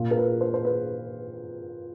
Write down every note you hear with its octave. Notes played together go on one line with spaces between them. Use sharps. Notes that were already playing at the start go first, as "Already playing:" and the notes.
Already playing: A#2 F4
A#4
B4
C5
C5
B4